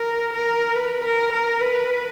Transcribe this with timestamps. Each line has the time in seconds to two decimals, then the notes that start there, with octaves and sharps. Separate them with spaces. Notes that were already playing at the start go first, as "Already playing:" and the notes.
Already playing: A#4
0.33 A#4
0.75 B4
1.04 A#4
1.32 A#4
1.61 B4